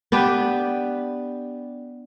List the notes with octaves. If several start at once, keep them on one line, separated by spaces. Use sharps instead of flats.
B3 D4 G4 B4